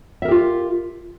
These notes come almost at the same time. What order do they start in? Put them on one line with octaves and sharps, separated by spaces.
E5 A#4 G4 F4